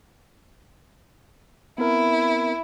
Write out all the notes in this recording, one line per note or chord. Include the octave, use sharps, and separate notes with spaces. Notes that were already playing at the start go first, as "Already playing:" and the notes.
B3 C4 E4 A#4